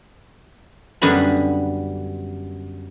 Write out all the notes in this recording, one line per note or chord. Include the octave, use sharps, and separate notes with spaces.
F#2 D3 G3 B3 B5